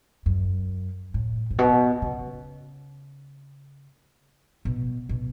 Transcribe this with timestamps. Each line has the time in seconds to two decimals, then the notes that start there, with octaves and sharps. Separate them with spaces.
0.26 F#2
1.14 A2
1.51 A2
1.59 B2
2.02 C#3
4.65 B2
5.09 B2